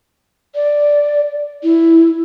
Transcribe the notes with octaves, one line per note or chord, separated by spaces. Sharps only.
D5
E4